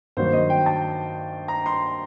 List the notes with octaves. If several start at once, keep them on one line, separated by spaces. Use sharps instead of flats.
G2 D#3 F#3 A#3 C5
D#5
G5
A5
A#5
C6